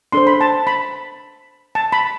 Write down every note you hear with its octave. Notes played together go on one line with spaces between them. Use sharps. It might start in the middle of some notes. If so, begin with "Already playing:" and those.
D4 A4 C5 C6
B5
A5
B5
A5
B5